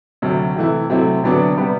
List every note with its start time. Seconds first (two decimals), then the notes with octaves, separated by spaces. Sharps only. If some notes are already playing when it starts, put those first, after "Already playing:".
0.22 D2 C3 F#3
0.56 C3 E3 A3 E4
0.90 C3 F#3 A3 C4 E4
1.23 D2 C3 F#3 B3 D4
1.57 C3 G3 B3